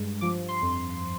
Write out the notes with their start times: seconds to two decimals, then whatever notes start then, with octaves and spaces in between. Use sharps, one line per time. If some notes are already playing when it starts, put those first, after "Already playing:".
Already playing: G2 G#3
0.21 F3 D6
0.48 C6
0.62 F2